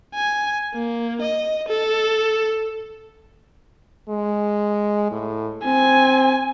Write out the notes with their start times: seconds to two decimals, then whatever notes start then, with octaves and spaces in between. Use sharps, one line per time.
0.14 G#5
0.74 A#3
1.21 D#5
1.69 A4
4.09 G#3
5.12 A2
5.66 C4 G#5